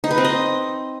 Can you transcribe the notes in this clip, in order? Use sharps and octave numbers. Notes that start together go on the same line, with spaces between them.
D#4
B4
C4
D#5